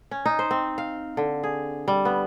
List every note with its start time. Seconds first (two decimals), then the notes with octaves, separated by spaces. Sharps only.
0.11 C#4
0.26 D#4
0.39 C5
0.51 C4
0.78 F5
1.17 D3
1.43 G#4
1.88 G3
2.05 B3